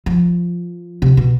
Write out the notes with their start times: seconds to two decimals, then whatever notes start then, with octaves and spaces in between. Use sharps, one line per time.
0.06 F3
1.02 C3
1.17 B2